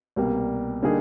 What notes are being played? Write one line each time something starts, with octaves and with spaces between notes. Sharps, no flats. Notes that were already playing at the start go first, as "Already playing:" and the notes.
C2 B2 G3 A#3
D3 G3 A#3 D#4 G#4